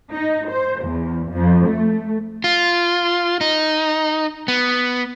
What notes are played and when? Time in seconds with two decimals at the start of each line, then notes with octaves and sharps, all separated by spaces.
0.12 D#4
0.50 C5
0.83 E2
1.31 F2
1.66 A3
2.44 F4
3.41 D#4
4.48 B3